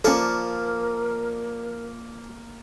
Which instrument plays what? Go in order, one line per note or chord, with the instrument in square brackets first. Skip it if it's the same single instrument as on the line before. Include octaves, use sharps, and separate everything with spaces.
[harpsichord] F3 A5 C#6 [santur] A#3 D5 [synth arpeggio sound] C#4 A4 [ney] A#4